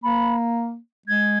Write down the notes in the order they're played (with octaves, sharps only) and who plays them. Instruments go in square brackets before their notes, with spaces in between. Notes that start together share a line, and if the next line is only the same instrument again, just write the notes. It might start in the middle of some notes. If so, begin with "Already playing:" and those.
[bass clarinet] A#3 [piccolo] B5
[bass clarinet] G#3 [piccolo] G#6